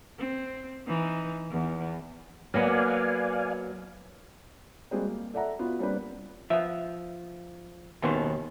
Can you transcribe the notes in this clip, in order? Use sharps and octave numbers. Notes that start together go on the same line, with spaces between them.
C4
E3 D#4
E2
F#3 A#3 B3 D5 F5 G#5
G3 G#3 A#3 C4 F#4 G#4
A#3
A4 D5 E5 F#5 A#5
B3 F4 F#4
G3 A#3 C4 D4 B4
F3 B3 E5
D#2 B2 D#3 E3 B3 C5